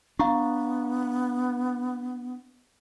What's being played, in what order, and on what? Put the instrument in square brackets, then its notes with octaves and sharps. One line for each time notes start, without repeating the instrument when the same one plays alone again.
[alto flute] B3 [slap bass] D4 [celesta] F5 A#5 C#6